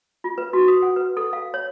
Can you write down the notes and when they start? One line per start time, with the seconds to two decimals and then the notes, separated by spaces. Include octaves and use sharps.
0.24 F4
0.38 B4
0.53 F#4
0.68 D#6
0.82 F#5
0.96 B4
1.17 A4
1.33 F5
1.54 C#5